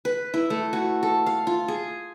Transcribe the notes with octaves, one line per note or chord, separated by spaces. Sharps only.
B4
E4
A3
F#4
A4
F5
F4
G#4